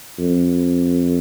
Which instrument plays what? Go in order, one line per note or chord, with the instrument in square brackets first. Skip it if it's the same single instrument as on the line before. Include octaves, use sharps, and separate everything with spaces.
[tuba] F2